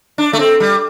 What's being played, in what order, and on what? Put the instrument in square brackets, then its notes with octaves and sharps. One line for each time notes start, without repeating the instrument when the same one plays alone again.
[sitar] D4
A3
C4
G3